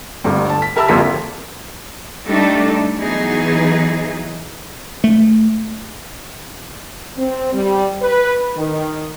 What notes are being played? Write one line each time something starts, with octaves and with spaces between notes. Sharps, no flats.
G1 D2 G2
A5
B6
G4 A#4 E5 A5 B5 E6
G1 F2 A#3 C6 B6
G3 A3 D4 D#4 A4
E3 F#3 B3 D#4 G#4
A3
C4
G3
B4
D#3